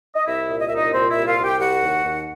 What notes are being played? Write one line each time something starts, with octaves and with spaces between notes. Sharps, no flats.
D#5
C2 E4 E5
A#2
D#5
C2 E5
D#4 D#5
A#2 C4 C5
E4 E5
C2
F4 F5
C2
G4 G5
G3 F#4 F#5
D#2
D#2